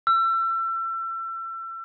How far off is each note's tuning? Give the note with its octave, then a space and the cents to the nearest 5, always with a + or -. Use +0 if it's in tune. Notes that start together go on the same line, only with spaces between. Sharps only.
E6 +35